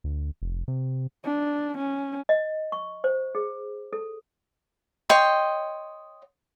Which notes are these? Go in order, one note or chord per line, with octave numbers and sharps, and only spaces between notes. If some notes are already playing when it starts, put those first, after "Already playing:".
D2
F1
C3
D4
C#4
D#5
C#6
C5
G#4
A4
C#5 D#5 G5 C6